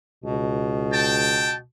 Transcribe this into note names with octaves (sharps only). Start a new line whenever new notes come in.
C#2 B2
G5 A5